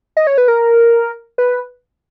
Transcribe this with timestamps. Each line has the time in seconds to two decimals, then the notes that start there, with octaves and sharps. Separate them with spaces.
0.17 D#5
0.27 C#5
0.38 B4
0.48 A#4
1.38 B4